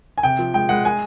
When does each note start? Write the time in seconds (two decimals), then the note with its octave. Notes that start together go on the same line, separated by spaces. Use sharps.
0.18 G#5
0.23 C3 G5
0.39 F3
0.54 G#3 G5
0.69 G#3 F#5
0.85 G#5